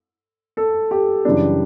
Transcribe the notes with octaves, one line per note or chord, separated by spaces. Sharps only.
A4
G4
F#2 C#3 E3 G3 D4